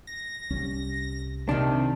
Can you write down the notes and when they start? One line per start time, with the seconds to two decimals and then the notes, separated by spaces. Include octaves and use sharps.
0.07 A#6
0.50 C2 G3 C#4
1.49 C3 D#3 D4